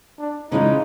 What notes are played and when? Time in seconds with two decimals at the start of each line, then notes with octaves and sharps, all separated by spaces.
0.19 D4
0.51 C#3 E3 G#3 C#4 D#4 F4